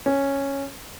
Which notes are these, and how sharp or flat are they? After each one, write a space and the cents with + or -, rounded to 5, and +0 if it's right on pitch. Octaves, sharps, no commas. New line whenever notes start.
C#4 -5